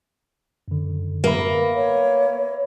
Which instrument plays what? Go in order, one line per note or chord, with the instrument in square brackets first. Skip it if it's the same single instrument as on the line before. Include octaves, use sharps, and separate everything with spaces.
[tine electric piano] F#2 D3
[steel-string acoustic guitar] A#3 [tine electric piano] B4 E5 B5
[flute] C#5